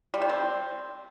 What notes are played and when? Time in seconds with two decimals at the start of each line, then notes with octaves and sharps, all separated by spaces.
0.14 G3
0.22 D#3
0.29 C4